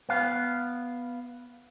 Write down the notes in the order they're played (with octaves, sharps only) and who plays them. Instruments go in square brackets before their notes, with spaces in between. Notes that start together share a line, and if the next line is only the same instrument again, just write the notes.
[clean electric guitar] B3 F5